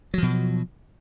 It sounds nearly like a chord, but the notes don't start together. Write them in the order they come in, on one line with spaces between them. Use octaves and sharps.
F#3 F3 B2